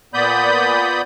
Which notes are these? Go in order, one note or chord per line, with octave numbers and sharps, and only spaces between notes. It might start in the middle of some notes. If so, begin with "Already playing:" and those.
A#2 B3 D5 B5 D#6 G6